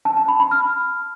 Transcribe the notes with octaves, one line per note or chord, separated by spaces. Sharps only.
A5
A5
B5
B5
F6